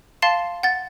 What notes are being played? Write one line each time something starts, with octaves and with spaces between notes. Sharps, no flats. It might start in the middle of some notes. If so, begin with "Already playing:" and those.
F5 A5 C6 A6 C7 E7
F#5 A6